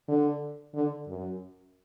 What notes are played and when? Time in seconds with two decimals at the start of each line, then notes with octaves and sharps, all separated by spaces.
0.08 D3
0.75 D3
1.08 F#2